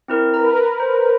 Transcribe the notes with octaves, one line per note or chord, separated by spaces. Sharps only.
C4 E4 A#4
A#4 B4 A#5
C5